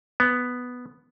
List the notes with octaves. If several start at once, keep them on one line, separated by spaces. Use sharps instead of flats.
B3